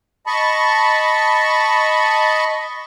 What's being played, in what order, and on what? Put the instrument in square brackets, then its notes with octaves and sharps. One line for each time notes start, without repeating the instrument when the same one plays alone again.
[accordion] D#5 A5 B5 C#6